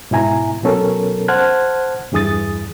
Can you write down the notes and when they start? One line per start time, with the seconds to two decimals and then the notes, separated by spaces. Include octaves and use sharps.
0.11 G#2 B2 E4 G#5 A#5
0.62 B2 F#3 B3 C#4 A4 A#4
1.28 C5 F#5 A5 F6 F#6 G#6
2.12 E2 G2 E3 G#4 D#6 A6